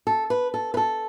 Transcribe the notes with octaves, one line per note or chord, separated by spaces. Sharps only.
A4
B4
A4
B4
A4